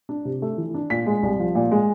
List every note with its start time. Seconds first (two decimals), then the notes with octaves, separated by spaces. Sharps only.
0.09 D4
0.25 C3
0.42 A3
0.58 E3
0.74 D4
0.90 A#2 B6
1.06 G#3
1.23 C2
1.39 F3
1.55 A#2
1.71 G#3